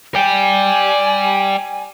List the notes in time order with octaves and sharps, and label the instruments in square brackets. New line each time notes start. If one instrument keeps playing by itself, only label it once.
[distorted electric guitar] D5 G5 [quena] G#5